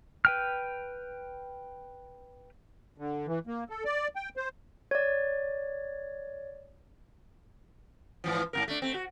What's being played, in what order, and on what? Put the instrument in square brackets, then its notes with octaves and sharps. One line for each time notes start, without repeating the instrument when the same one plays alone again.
[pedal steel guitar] B4 G5 F6
[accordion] D3
E3
A#3
A4
D5
G5
C5
[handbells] C#5 D5
[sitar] G#2 E3 F3
G#2 B2 A#4
A3 D4
A3 C4
F#4